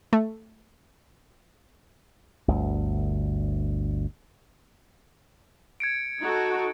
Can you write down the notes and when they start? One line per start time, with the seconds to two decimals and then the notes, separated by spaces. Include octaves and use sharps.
0.13 A3
2.48 G1 D2
5.80 G#6 C#7 D7
6.20 D#4 F#4 A4